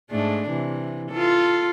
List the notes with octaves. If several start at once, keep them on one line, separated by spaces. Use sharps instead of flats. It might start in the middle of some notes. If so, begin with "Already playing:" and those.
G#2 A3 D4
C3 E3
F4 A4